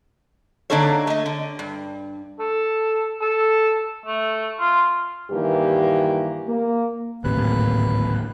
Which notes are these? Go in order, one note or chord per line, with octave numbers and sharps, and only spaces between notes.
D3 A#3 D4 D#4 A4 C#5
A3 D#5
D3
G2
A4
A4
A3
F4
G2 D#3 E3 A#3 G4
A#3
D1 G#1 A2 C3 A#3 B4 F#6